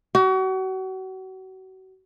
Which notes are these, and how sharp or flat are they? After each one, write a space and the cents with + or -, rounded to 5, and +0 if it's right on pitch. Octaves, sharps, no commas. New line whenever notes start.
F#4 +35